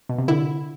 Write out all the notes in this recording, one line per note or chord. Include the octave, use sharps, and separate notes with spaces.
B2
C3
D3 E4